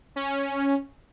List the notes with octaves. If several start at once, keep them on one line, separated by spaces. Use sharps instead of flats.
C#4